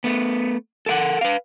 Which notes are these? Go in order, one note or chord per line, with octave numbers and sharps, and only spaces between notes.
A3 B3
A4 A#4 F5 F#5
B4 F5